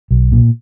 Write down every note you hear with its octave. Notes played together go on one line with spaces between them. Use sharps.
B1
A#2